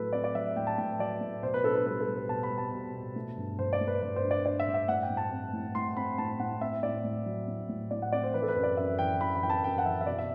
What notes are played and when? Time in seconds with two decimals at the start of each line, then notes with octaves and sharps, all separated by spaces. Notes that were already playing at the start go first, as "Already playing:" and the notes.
Already playing: A2 F#3 A4 B4
0.13 C4 D5
0.24 D5
0.35 F#3 E5
0.57 A2 G5
0.67 A5
0.78 A2 G5
0.99 F#3 D5
1.21 A2
1.43 B2 C5
1.54 B4
1.64 D4 A4
1.75 B4
1.86 G3 B4
2.00 A4
2.07 G3
2.15 B4
2.29 B2 A5
2.43 B5
2.50 G3
2.58 A5
2.72 B2
2.94 B2
3.16 A3
3.37 G2
3.59 G2 C5
3.73 D5
3.81 A3
3.87 B4
4.02 G2 B4
4.16 C5
4.24 D4
4.31 D5
4.45 D4 D5
4.60 E5
4.67 G2
4.74 E5
4.88 A2 F#5
5.03 G5
5.10 A2
5.17 A5
5.32 C4
5.53 A2
5.75 A2 C6
5.96 C4 B5
6.18 A2 A5
6.40 A2 F#5
6.61 C4 E5
6.83 A2 D5
7.05 A2
7.26 F#3
7.48 A2
7.69 A2
7.91 A2 D5
8.02 F#5
8.12 C4 D5
8.23 C5
8.34 E3 B4
8.42 A4
8.48 B4
8.56 F#2
8.63 D5
8.77 F#2 E5
8.99 E3 G5
9.21 E3 B5
9.35 B5
9.42 E3 G5
9.50 A5
9.64 F#2 G5
9.78 F#5
9.85 E3 E5
10.01 E5
10.06 B2 D5
10.19 E5